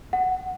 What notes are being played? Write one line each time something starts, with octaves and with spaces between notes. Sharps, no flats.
F#5